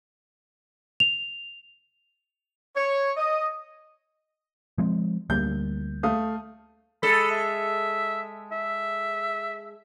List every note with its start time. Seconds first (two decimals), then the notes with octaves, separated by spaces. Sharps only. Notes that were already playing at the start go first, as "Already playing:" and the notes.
1.00 F7
2.76 C#5
3.17 D#5
4.78 F3 G#3 C4
5.30 D2 G3 A#3 G6
6.03 A3 F5 D#6
7.03 G#3 A4 B5
7.31 E5
8.52 E5